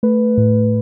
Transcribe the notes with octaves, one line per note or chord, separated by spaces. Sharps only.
A3 B4
A2